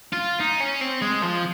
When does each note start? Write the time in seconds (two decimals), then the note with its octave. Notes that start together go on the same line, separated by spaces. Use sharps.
0.13 F4
0.40 D#4
0.61 C#4
0.81 C4
1.01 G#3
1.22 F3